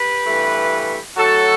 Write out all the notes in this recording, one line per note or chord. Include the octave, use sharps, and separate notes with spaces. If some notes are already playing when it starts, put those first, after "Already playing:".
Already playing: G4 B4
G2 E3 A3
A2 F#3 A3 F#4 A4